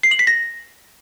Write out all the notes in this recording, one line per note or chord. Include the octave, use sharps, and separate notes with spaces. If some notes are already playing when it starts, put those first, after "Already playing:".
C7
F#7
B6
A#6